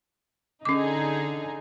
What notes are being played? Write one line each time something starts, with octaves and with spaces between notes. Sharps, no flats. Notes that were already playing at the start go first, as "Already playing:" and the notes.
D3 C#4 D#4 G#4 D6